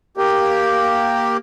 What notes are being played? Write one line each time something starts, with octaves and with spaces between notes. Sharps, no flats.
A#3 G4